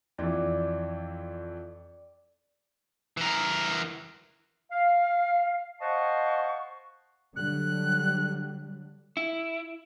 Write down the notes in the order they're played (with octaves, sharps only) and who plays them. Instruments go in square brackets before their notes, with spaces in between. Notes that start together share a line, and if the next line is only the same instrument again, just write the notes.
[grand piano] F2 E3 [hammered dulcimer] D5
[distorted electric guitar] E3 A#4
[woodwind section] F5
C5 D#5 F5 F#5 A5 C#6
[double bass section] D3 F#3 G3 [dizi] F#6
[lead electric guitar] E4